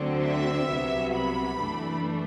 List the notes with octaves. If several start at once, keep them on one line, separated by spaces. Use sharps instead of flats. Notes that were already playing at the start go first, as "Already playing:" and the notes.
Already playing: D2 D3 F#3 C4
E5
C2 C3 F#3 B3
B5
F#2 E3 A3 D4